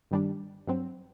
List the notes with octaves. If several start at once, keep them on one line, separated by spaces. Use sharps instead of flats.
G2 D#3 G3 D4
G2 F#3 C4